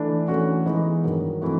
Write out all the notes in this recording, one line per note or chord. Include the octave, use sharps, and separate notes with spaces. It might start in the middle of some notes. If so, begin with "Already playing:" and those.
Already playing: E3 A3 D4
E3 A3 C#4 F#4
E3 G#3 B3 D#4
G2 D#3 F#3
E3 A3 C4 D#4 F#4